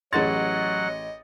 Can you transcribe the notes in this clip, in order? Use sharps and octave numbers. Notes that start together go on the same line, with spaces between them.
A1 F#3 G#4 D#5 F#5 C6 A6